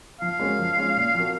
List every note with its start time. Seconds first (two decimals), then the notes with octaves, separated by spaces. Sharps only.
0.21 F3 F5
0.39 G#3 C#4 F#4 A#4
0.59 F3
0.77 G#3 C#4 F4
0.96 A#2
1.15 F3 C4 F#4 A#4